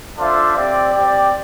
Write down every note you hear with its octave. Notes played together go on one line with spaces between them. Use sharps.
D4 F4 A4 C5 E5
C4 G4 D5
C4 G4 D5 G5